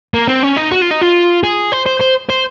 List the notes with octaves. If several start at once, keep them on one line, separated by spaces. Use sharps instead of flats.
A#3
C4
C#4
D#4
F#4
F4
D#4
F4
G#4
C5
C5
C5
C5